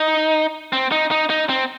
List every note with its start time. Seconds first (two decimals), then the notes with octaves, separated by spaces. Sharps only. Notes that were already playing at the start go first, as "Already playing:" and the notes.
Already playing: D#4
0.73 C4
0.92 D#4
1.11 D#4
1.30 D#4
1.49 C4